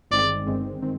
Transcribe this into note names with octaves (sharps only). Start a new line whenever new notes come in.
G1 G2 D#3 G#3 C4 D5
G1 G2 D#3 G#3 C4
D#3 C4